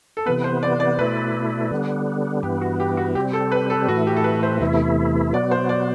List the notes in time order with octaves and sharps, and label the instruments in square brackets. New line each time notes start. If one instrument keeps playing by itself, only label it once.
[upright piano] A4
[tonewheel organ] C3 E3 B3 [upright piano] B4
[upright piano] C5
D5
D5
[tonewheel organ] B2 A3 E4 [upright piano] B4
[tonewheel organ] D3 G3 B3
[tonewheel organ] G2 E3 B3 [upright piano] G4
[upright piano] F#4
G4
F#4
[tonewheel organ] C3 G3 C4 [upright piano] G4
[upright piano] A4
B4
A4
[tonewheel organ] A2 E3 A3 [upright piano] F#4
[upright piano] G4
A4
B4
C5
[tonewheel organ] E2 C3 E3 A3 E4 [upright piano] E5
[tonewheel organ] B2 F#3 B3 [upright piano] D5
[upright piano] C5
D5